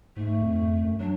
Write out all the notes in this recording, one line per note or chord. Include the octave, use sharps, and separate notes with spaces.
G#2 A3
F2
F#2
F#3 D4